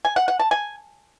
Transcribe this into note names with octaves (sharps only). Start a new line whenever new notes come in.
G#5
F#5
F#5
A5
G#5